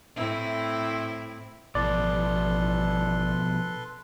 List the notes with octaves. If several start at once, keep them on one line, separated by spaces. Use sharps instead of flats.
A2 C4 E4
A1 B2 F3 A4 B4 D5 C6